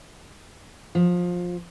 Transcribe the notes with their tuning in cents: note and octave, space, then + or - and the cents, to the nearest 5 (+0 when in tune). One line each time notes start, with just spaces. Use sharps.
F3 +20